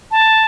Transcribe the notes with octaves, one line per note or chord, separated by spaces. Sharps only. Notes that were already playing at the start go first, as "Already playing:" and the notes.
A5